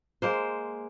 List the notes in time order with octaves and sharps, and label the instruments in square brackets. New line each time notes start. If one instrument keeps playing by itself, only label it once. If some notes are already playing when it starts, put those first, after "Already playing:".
[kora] G#3 A#3 C5